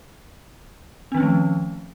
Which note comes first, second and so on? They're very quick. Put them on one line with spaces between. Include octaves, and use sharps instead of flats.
C4 D#3 C#4 F3 A3